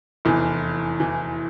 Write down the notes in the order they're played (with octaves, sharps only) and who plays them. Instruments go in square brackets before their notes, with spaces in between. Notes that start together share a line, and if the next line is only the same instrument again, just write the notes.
[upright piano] F1 E2 E3
E3